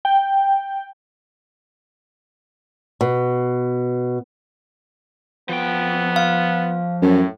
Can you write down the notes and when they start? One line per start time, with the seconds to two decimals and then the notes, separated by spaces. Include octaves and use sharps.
0.05 G5
3.01 B2
5.49 F3 B3 G5
6.16 F5
7.02 F#2 A2